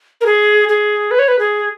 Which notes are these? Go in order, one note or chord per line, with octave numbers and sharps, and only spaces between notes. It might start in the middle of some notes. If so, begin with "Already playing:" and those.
A#4
G#4
G#4
B4
C#5
B4
G#4